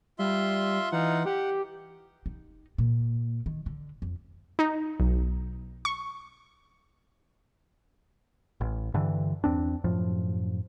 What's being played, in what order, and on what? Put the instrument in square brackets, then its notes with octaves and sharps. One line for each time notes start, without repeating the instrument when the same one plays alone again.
[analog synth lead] G3 [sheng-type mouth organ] F4 E5 C6
[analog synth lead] E3 [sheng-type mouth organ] D#4 F4 F#5
[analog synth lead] G4 [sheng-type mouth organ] F#5
[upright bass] D#4
A#2
D#3
D3
F2
[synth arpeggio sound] D#4
B1
C#6
[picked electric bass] A1
G2 D3 E3
E2 C4 D4
F#2 A2 F3